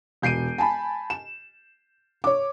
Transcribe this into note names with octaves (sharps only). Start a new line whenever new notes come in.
E1 G6 C7 D7 D#7
G#5 A5 B5
E7
C#5 D6